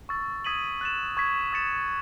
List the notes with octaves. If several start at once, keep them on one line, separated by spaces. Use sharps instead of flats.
C#6 E6 A6
D#6 G#6 B6 D#7 F#7
F#6 A6 E7
C#6 G#6 B6
D#6 A6 C#7 E7